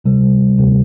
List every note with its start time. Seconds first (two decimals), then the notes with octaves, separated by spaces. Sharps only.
0.04 D2 C3 G3
0.58 D2 C3 G3